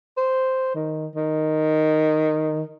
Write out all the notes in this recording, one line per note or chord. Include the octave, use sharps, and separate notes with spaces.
C5
D#3
D#3